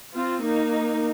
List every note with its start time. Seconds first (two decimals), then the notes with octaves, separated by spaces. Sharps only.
0.15 C4 F4
0.44 A#3 D#4